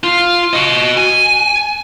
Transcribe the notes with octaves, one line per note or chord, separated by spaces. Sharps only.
F4
F#4 D#5
G#5